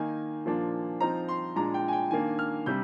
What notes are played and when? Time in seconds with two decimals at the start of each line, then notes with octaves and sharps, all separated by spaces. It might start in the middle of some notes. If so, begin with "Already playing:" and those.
Already playing: D#3 A#3 D#4 G#5
0.45 A#2 F3 A#3 D4
1.01 F3 C4 D#4 A#5
1.29 C6
1.56 A#2 G#3 D4 A#5
1.74 G5
1.88 G#5
1.93 G5
2.11 D#3 A#3 D4 G#5
2.39 F6
2.66 C3 G3 D4 G6